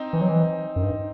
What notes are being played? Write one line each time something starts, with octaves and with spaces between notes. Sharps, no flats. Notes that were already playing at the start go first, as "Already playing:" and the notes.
Already playing: C4 D#4
E3
F#3
E3
F#2
G2